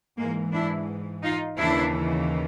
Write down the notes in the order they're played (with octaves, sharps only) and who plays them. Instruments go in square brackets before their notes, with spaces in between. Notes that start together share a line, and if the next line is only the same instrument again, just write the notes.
[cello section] G#2 E3 G#3 A#3
D4 E4
D#4 F4
D#2 C#3 E3 D4 E4